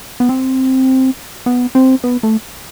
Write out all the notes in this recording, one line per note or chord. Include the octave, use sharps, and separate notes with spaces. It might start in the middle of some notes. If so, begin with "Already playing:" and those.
B3
C4
B3
C4
B3
A3